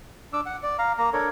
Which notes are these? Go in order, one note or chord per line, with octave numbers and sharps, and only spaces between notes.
D4 D6 E6
F#5
D5
F5 A#5
A#3 A#5
D4 A4 A#4 C#5